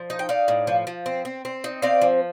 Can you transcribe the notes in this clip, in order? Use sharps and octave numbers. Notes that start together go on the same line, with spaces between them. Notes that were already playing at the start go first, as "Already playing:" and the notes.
Already playing: F3
D#4
G5
D#4 D5 F5
A2
F3
F3
C4
C4
C4
D#4
C4 D5 F5
F3